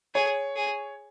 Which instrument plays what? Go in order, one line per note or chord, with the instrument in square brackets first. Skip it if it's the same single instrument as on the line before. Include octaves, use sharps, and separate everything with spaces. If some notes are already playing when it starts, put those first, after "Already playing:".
[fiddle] G#4 [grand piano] C#5
[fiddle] G#4